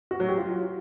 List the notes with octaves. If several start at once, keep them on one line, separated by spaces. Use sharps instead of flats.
F#4
F#3
G4
F4